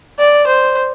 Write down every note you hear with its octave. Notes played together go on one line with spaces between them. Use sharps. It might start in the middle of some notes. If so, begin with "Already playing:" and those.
D5
C5